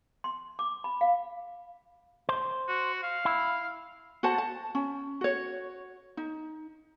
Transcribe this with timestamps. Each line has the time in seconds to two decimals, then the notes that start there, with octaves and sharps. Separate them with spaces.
0.24 C6
0.59 D6
0.84 B5
1.01 F5
2.29 C5
2.68 F#4
3.03 F5
3.25 E4
4.23 F#4 C5 F#5 A5
4.38 A5
4.75 C#4
5.21 F#4 C#5
6.17 D#4